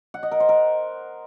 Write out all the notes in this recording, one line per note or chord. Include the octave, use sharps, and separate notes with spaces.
F#5
D#5
A#4
C5
A#4